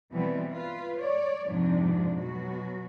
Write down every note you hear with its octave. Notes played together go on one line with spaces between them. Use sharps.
B2 E3 G3 B3 C4
F4 B4
C#5 D5
F2 G#2 C3 F3 D4
B2 F#3 F#4